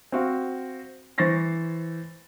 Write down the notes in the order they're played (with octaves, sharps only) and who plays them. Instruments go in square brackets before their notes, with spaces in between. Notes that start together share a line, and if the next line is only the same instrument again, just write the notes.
[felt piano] C4 F#4 F5
E3 C5 C#6 A6 A#6 C7